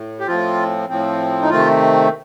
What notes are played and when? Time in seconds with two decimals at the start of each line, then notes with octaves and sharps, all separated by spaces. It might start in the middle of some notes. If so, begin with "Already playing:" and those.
Already playing: A2
0.20 G4
0.27 A2 F3 C4 F4
0.89 A2 F3 C4
1.42 D#4
1.50 C3 D#3 A3 C4 F4